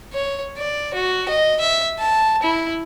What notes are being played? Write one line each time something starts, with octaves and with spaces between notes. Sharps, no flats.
C#5
D5
F#4
D#5
E5
A5
E4